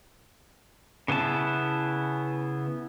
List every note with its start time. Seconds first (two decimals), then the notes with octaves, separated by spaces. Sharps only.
1.08 C#3 B3 E4 A5